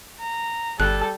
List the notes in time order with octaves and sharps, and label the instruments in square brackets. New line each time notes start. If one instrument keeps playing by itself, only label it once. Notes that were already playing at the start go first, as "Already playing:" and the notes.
[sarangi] A#5
[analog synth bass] G1 [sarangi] G3 [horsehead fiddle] A4 [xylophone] F#6